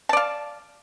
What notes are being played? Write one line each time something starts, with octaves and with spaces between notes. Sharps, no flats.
D5 F5 A5